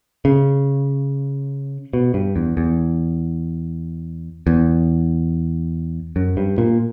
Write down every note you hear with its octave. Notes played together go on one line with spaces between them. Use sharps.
C#3
B2
G2
E2
E2
E2
F#2
G2
A#2